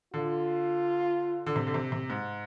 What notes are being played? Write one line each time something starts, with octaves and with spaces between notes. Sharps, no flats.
D3 F4
D3
C3
D3
C3
C3
G#2